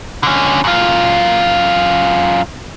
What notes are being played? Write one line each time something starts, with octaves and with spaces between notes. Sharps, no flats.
D3 C#4
F#2 F4